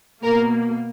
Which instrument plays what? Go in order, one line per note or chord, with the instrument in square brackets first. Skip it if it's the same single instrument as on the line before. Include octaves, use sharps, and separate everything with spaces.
[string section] B2 A#3 A#4